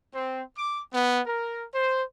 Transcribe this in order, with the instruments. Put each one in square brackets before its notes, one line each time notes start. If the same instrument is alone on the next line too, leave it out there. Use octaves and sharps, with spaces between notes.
[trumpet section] C4
D6
B3
A#4
C5